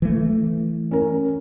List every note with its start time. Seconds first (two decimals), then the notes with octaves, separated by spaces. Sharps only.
0.02 E3 A3
0.91 C#4 A#4